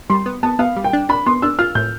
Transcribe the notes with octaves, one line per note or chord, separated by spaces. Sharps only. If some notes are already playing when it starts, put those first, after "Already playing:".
G3 C6
B3
B3 A5
B3 F5
G3
G5
D4
D4 B5
B3 C6
D4 E6
F4 F6
A2 G6